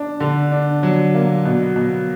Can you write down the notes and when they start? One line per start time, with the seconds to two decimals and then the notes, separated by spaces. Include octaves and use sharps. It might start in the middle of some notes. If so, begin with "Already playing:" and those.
Already playing: D4
0.20 D3
0.52 D4
0.83 F#3
1.14 A#3
1.45 B2
1.76 B2